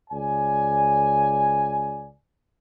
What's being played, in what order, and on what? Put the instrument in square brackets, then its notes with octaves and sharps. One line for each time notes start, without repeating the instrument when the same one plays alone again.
[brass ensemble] C#2 D5 G#5